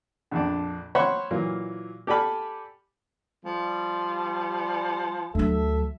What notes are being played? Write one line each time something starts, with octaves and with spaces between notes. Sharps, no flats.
A#1 F2 D4
C5 C#5 E5 F#5 B5 C#6
A#2 E3 F#3 A#3
G4 A4 D5 G#5 B5 F6
F3 G3
D2 F#3 A4 E5